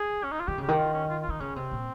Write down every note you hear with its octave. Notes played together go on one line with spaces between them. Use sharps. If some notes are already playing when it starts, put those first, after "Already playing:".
Already playing: G#4
C#4
D#4
F4
D#3 G4
C#3
G4
D#3
F4
C#4
F4
F4
D#3 D#4
C#3 C#4
C3 C4
A#2